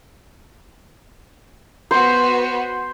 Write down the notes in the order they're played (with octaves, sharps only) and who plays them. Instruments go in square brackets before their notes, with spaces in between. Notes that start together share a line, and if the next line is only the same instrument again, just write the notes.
[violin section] B3 F#4 [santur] C5